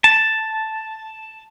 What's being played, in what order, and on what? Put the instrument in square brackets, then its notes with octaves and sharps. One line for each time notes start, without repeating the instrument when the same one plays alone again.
[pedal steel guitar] A5